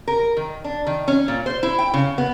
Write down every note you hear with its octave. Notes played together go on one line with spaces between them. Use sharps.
A#4
D#3
D4
D#3
C#4
A#2
C5
E4
G5
C#3
B3